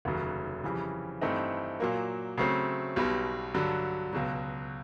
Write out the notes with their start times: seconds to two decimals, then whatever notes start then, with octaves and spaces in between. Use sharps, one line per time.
0.05 F1 D#2 C#3 F#3
0.64 F2 C#3 E3 G3
1.21 G2 E3 A3 C4 D#4
1.80 A#2 F#3 A#3
2.38 C#3 F#3 A3 C4
2.96 B1 B2 G3
3.54 G2 D3 F#3
4.13 C#2 B2 F#3